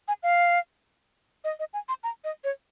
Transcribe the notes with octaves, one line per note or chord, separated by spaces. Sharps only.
G#5
F5
D#5
D#5
G#5
C6
A#5
D#5
C#5